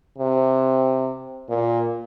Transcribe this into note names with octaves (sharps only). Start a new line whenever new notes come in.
C3
A#2